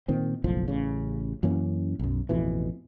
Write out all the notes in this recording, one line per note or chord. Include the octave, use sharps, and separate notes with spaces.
A#2 D#3 C4
F#1 B1 A2 F3
A1 C#3
F#2 E3 A#3 C#4
B1 F#2
A1 F2 B2 E3